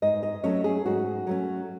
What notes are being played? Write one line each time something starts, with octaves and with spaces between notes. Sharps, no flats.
G#2 D#5
D#5
F#3 A3 C#4 C#5
G#4
G#2 F#4
F#3 A3 C#4